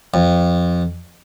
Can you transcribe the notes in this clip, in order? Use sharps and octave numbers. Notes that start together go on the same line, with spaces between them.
F2